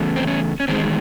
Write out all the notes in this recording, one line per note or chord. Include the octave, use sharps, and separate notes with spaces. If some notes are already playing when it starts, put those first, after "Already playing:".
Already playing: E2 C#3 A3
C4
C#4
C#4
E2 D#3 G#3 C4